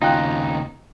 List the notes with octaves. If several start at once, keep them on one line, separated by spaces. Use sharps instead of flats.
D#2 C#3 D#4 F4 G5 F#6